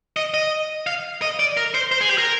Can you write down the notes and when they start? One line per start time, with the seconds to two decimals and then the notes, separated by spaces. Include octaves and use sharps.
0.16 D#5
0.34 D#5
0.87 F5
1.22 D#5
1.39 D5
1.57 A#4
1.74 C5
1.92 C5
2.01 G#4
2.09 G4
2.18 A#4